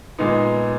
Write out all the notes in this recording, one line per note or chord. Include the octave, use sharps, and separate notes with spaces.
A#2 G#3 B3 D#4